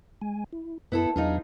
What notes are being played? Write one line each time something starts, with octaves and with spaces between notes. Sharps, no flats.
G#3 G#5
E4
F#2 B3 E4 A4
E2 F#3 D4 D#4 F4 G#4